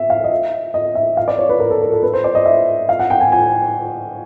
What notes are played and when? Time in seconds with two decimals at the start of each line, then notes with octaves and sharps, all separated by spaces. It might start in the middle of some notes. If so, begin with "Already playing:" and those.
Already playing: E5
0.10 F5
0.24 D#5
0.31 E5
0.74 D#5
0.95 E5
1.17 F5
1.28 D5
1.38 C#5
1.49 B4
1.60 A#4
1.71 A4
1.82 A#4
1.92 A4
2.03 B4
2.13 C5
2.24 D5
2.35 D#5
2.46 E5
2.89 F5
2.99 F#5
3.10 G5
3.21 G#5
3.32 G#5